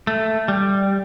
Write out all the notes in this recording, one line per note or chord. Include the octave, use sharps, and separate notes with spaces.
A3
G3